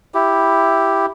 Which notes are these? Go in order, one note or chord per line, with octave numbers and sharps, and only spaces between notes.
E4 G4